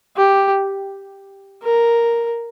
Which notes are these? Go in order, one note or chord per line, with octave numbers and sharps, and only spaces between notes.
G4
A#4